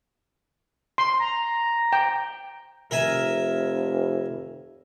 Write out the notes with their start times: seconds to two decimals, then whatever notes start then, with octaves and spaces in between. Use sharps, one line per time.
0.98 C6
1.19 A#5
1.93 G5
2.91 F1 A#4 E5 G#5